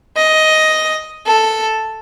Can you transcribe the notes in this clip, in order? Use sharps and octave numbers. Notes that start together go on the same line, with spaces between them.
D#5
A4